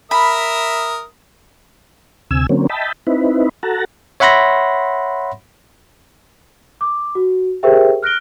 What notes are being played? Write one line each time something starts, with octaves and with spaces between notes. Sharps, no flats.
A#4 E5 B5 D#6
D2 C3 G#5 E6
D3 F#3 A#3 C4 C#4
D#5 E5 G5 A5 B5
C4 D#4 E4 B4
F#4 A4 F#5 A5 A#5
C#5 E5 F#5 B5 C6 A#6
D6
F#4
G4 G#4 A#4 C5 E5 G5
F6 F#6 A#6 D7 G7